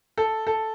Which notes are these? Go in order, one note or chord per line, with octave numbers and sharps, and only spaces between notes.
A4
A4